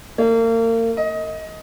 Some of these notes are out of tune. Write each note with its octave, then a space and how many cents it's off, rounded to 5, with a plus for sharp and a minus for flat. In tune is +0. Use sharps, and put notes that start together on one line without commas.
A#3 -35
D#5 +20